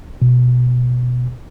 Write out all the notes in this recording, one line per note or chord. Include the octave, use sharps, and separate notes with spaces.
B2